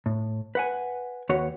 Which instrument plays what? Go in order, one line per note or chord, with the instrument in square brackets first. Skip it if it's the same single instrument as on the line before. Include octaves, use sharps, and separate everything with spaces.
[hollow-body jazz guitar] A2
B4 F#5 G#5
D#2 F#4 B4 C#5 F#5